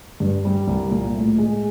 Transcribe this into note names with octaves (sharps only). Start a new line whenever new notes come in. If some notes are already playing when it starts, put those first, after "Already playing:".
G2
G3
C2
A#2
A2
G#3